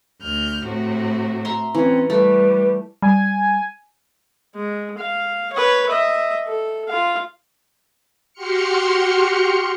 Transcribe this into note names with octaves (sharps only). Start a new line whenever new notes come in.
D2 F6 G6
A2 C3 F#4
E5 A#5 C6
E3 C4 C#4
G3 A3 B4
G3 G#5
G#3
F5
B4 C#5
D#5 E5
A4
F4 F5
F#4 G4 C6 F6 C#7